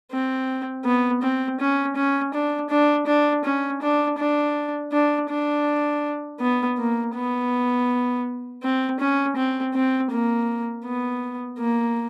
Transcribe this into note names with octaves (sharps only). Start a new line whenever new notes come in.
C4
B3
C4
C#4
C#4
D4
D4
D4
C#4
D4
D4
D4
D4
B3
A#3
B3
C4
C#4
C4
C4
A#3
B3
A#3